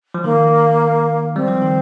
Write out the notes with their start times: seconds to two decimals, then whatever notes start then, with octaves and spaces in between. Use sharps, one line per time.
0.14 F3
0.24 D#3 A#3
1.35 G3 C4
1.48 F3
1.62 D#3